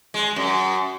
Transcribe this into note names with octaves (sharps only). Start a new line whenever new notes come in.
G#3
F#2